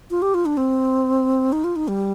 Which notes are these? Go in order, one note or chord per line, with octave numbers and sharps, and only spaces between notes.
F4
G4
F4
D4
C4
D#4
F4
D#4
G3